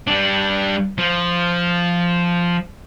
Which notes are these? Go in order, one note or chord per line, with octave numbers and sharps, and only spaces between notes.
G3 D4
F3